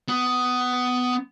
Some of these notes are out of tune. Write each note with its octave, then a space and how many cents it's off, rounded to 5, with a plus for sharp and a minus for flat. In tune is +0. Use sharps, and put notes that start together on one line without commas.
B3 +15